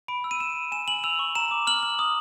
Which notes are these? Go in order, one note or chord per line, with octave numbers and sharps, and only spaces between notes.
B5 D7
E6
D#7
E6 E7
B5
G#5 E7
G#5 F#7
E6 F7
C#6
A#5 E7
D6
F6 F#7
F6
D#6